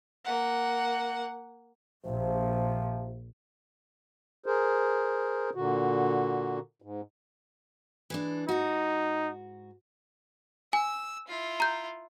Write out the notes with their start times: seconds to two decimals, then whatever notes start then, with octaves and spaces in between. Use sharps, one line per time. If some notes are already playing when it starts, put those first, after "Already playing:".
0.25 A#3 F#5
2.06 A#1 C3 F3
4.46 G#4 A#4 C5
5.55 A#2 D3 F#4
6.82 G#2
8.10 E3 G#3 D4
8.49 G#2 D#4 F#4
10.73 G#5 E6
11.28 E4 F4
11.60 A#5 G6